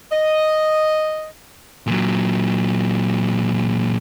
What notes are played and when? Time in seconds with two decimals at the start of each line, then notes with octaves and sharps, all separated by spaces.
0.11 D#5
1.88 A#2 F#3